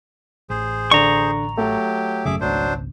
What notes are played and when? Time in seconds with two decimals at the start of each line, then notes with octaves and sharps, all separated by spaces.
0.50 A1 G#4 C5
0.91 D3 D5 A#5 C#6
1.57 F#3 A3 G4
2.25 G#1 F#2 C#3 G#4 E5 D6
2.41 G#1 C#2 F#3 D4 C5